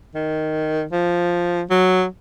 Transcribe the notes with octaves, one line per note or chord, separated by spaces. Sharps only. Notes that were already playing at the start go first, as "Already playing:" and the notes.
D#3
F3
F#3